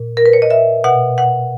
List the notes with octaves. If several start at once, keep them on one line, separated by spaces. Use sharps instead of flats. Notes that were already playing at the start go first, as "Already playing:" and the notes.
Already playing: A#2
A#4
B4
C#5
D#5
E5
B2 F#5
F#5